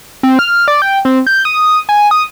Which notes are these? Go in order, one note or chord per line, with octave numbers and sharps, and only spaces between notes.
C4
F6
D5
G5
C4
G6
D#6
G#5
D#6